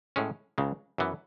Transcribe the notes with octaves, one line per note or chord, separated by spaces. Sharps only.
A2 G#3 C#4
C#2 C#3 G#3
F#2 E3 B3